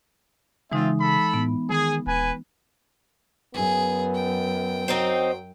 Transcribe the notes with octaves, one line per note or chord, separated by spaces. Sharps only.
C#3 E3 G#3 C4 D#4 F4 E5
A4 B5
A2 B3
D#3 G#4
D#1 B4 G#5
F#2 B3 G#4
G5
F#3 C4 D#4 C5